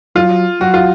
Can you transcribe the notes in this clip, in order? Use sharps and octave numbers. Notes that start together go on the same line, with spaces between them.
F#3 F4
F#3 F#4
F4